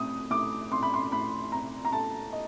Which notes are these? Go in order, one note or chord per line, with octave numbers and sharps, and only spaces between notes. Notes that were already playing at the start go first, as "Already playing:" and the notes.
Already playing: A2 C4 D#6
A2 D6
C4 C6
B5
C6
A2 B5
C4 A#5
A#5
A3 A5
D#5